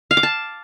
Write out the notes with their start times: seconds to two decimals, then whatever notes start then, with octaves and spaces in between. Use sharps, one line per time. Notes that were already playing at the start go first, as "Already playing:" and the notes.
0.11 F5
0.17 D6
0.23 A5